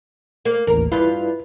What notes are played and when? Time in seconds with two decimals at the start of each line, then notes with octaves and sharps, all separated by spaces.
0.45 A#3
0.67 A1 D#2 A#4
0.92 G2 E4 F4 B4